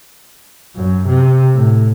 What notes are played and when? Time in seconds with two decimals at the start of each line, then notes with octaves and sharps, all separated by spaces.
0.76 F#2
1.07 C3
1.54 A2